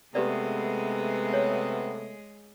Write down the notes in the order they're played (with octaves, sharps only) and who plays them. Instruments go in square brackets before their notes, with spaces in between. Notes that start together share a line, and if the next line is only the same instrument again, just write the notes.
[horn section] C3 A3 B3 [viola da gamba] G#3 G#4 [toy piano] G4 B4 D5
[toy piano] C#5